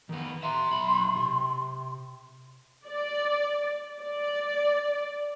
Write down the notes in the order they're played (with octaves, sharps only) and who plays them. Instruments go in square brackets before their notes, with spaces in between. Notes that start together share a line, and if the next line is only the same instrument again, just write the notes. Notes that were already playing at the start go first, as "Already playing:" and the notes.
[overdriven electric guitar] D#3 B3
[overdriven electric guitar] E5 A#5 [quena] C6
[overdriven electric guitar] B1 B5
C3
[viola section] D5
D5